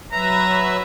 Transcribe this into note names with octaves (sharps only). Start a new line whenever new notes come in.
F#3 B4 E5 A#5